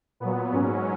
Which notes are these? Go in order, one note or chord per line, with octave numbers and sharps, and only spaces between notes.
A#2 F#3 B3
G#2 F#3 C#4